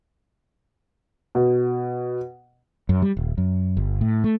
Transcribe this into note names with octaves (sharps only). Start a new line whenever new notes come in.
B2
F#2
G3
D#1
F#2
G1
A2
A3